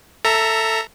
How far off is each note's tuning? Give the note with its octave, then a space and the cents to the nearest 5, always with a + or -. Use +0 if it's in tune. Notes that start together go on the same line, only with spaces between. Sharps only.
A4 +15 E5 +0 A#5 +0